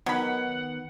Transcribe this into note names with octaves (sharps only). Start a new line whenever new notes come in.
D#3 F#3 B3 F#5 B5